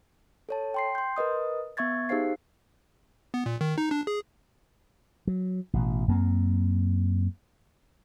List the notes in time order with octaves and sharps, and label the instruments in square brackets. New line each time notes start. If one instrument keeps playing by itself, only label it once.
[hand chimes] A4 C#5 A5
G5 C6 C7
C6 G6
A#4 B4 D#5 D#6
B3 E5 C#6 G#6 A6
D#4 G4 G#4 C5 F5 C7
[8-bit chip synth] B3
A#2
D#3
D#4
D4
G#4
[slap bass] F#3
A1 B2
F#2 A#3 C4